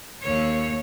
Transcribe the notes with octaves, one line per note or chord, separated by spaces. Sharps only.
D#2 C#5